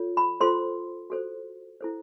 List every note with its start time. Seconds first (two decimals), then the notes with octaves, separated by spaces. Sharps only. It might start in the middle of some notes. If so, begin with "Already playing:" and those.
Already playing: F4 A4 C#5
0.17 B5
0.41 F4 A4 C5 C6
1.10 F#4 A4 C5
1.81 E4 A4 C5